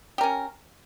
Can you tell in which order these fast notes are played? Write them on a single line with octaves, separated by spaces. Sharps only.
G4 A#4 C#4